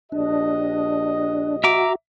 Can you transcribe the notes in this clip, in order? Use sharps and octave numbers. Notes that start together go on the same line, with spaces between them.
A#1 D4 G4 D#5
F#4 E5 A#5 D6